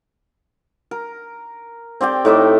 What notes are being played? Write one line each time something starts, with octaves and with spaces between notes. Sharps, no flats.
A#4
C4 G4 D5 G5
A2 D#4 E5 D6